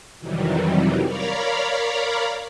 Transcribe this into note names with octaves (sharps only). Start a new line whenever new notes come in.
F2 C3 D#3 E3 F#3 G3
A#4 C#5 D5 F5 A#5 B5